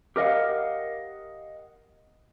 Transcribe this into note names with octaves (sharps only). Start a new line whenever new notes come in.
G4 A#4 D#5 F5 F#5